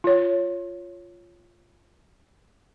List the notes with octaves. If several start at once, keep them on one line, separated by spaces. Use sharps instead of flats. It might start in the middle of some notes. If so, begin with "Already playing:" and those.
F4 C#5